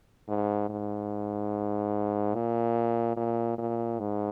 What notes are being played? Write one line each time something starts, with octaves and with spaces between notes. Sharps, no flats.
G#2
G#2
A#2
A#2
A#2
G#2